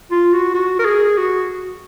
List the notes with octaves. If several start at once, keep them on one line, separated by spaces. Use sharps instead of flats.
F4
F#4
F#4
A#4
G#4
F#4